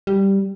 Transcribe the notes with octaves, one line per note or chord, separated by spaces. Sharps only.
G3